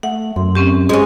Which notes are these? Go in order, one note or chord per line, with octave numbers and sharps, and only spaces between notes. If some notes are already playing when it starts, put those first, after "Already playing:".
A3 F#5
F#2 C6
C4 C#4 G4
G#3 C#4